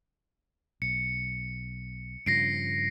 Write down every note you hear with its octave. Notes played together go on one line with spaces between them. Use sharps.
B1 C#7
G2 C#3 F3 A#6 C7 D7